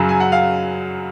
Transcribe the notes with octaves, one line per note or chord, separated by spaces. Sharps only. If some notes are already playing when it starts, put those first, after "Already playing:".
Already playing: F#2 C#3 F#3
G#5
F#5
F5